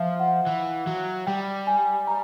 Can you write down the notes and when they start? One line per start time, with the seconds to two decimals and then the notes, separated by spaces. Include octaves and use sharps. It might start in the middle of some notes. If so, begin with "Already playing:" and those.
Already playing: F3 E5 F5
0.20 F#5
0.47 E3
0.87 F#3
1.27 G3 G5
1.67 G#5
2.07 A#5